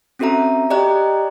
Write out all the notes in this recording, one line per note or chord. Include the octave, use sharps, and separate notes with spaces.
C4 C#4 F#4 A4 E5 A#5
G4 D5 D#5 G5 A#5 F#6